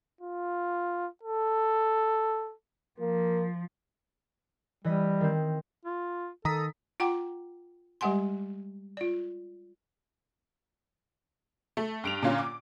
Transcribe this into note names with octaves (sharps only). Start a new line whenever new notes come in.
F4
A4
F3 A#3
E3 G3 D#5 B6
D#3 C4
F4
D#3 A4 A#5 D#6 B6
F4 F#5 G5 A#5 D6
G3 G#3 G4 F#5 G#5 C6
F4 D5
A3
G2 D7 F7
A#2 D3 C#4 F4
D6